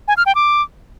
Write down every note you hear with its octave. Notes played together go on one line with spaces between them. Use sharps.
G#5
F6
G5
D6